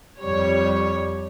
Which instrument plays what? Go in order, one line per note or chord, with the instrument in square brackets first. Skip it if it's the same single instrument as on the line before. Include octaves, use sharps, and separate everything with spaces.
[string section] F2 G3 C#5